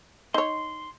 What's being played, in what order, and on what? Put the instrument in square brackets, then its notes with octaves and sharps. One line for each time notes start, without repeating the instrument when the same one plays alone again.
[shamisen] D#4 C#5 [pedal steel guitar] C6